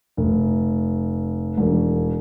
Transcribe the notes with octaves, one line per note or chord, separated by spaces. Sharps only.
F1
E1